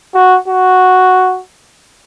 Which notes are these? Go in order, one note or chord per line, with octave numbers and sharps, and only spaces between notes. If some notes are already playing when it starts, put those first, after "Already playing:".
F#4
F#4